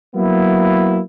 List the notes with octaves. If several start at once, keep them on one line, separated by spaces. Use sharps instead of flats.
F#3 A#3 B3 E4